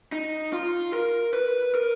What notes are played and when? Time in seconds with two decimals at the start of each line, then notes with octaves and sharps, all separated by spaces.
0.12 D#4
0.53 F4
0.93 A#4
1.33 B4
1.75 A#4